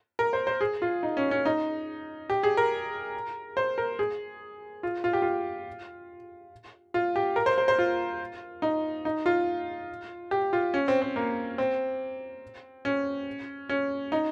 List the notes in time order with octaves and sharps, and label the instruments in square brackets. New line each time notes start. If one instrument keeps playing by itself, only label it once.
[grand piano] A#4
C5
C5
G#4
F4
D#4
C#4
C#4
D#4
G4
G#4
A#4
C5
A#4
G#4
F4
F4
G4
F4
F4
G4
A#4
C5
C5
C5
F4
D#4
D#4
F4
G4
F4
C#4
C4
C4
A#3
C4
C#4
C#4
D#4